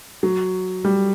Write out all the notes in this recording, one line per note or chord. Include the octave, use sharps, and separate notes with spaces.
F#3
G3